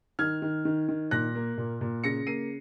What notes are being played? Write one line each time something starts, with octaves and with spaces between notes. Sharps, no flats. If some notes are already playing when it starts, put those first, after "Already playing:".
D#3 F6 G#6
D#3
D#3
D#3
A#2 F#6 A#6
A#3
A#2
A#2
C#3 A#6 C#7
A#3 C7 D#7